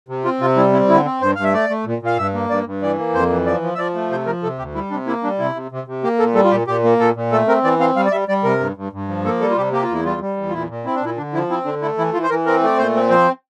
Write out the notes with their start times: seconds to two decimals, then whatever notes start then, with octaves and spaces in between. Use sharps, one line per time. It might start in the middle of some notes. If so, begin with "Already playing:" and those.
0.09 C3
0.25 C4 F4
0.41 C3 F4
0.57 G3 E4
0.73 C4 E4
0.89 D3 E4
1.05 C4
1.21 G2 C5
1.35 G2 F5
1.44 E5
1.53 A3 D5
1.69 A3
1.85 A#2
2.02 A#2 F5
2.17 G2 E5
2.34 A#3
2.50 G2 D5
2.66 G2
2.82 E3 D5
2.98 A#3
3.14 F2 C5
3.30 E3
3.46 F3 D5
3.62 F3
3.75 E5
3.78 F3 D5
3.95 A3
4.11 C3 C5
4.26 F3 A#4
4.43 C3 A4
4.59 D2 G4
4.75 G3 E4
4.91 C3 D4
5.07 A#3 E4
5.23 G3 D4
5.39 C3 E4
5.55 C3
5.71 C3
5.87 C3
6.04 A#3 G4
6.19 A#2 A4
6.35 G3 A4
6.44 F4
6.51 A#2 G4
6.67 A#2 G4
6.84 A#3
7.00 A#2 A4
7.16 A#2
7.32 A3 A4
7.48 C4 A#4
7.64 E3 D5
7.80 C4 F5
7.96 G3 F5
8.05 D5
8.12 G3 E5
8.28 G3 D5
8.44 C3 A#4
8.60 G2
8.76 G2
8.92 G2
9.08 F3
9.25 A#3 A4
9.41 G3 A4
9.51 F4
9.57 C3 G4
9.72 A#3 G4
9.83 F4
9.89 E2 E4
10.05 G3 F4
10.21 G3
10.37 E2
10.49 F4
10.53 A#2 E4
10.69 A#2
10.85 C4 E4
10.95 D4
11.02 A#2 E4
11.17 D3 D4
11.34 F3 E4
11.50 C4 E4
11.65 D3 D4
11.82 A3 E4
11.98 E3 E4
12.13 E3 F4
12.23 C5
12.30 E3 A#4
12.46 C4 A#4
12.62 A3 D5
12.78 A#2 C5
12.95 C4
13.10 F3 C5